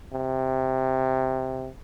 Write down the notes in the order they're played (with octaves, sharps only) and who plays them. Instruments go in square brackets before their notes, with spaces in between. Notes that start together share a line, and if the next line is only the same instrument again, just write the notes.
[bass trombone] C3